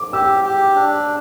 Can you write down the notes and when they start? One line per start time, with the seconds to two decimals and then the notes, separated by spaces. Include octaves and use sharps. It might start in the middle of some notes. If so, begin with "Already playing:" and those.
Already playing: D6
0.13 G4 E6
0.45 G4
0.75 D4